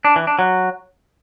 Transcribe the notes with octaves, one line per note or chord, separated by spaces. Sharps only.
D4
E3
D4
F#3